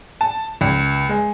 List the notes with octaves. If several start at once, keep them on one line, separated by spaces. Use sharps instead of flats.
A5
C#2
G#3